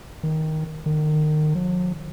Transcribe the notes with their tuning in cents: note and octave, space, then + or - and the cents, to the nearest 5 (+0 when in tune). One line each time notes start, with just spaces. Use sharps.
D#3 +10
D#3 -30
F#3 -45